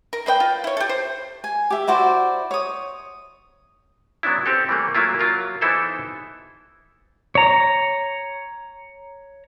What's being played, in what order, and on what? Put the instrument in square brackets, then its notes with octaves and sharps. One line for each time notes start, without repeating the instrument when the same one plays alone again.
[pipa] A#4
G#3 B4 D5 G5
F4
E4 C#5
G4 A4
C5
[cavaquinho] G#5
G4 E5
E4 F#4 C5 D5
C#5 D#6
[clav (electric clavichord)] F#3 B3 C#4 D4 E4
C4 G4 A4
E3 G3 A3 A#3
F#3 A3 A#3 E4 F4
F#3 F4 A#4
E3 B3 D#4 E4 A4 C5
[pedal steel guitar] C#5 A#5